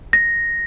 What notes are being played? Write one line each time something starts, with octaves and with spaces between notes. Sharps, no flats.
A#6